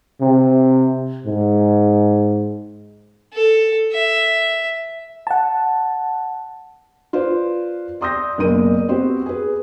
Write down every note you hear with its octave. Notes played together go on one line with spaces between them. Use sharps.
C3
G#2
A4
E5
F#5 A5
F4 B4 C5 D5
D5 C6 D#6 E6 G6 A#6
F#1 B2 A#3 D5 D#7
B3 C4 F#4 G4 B4 C5
G#4 B4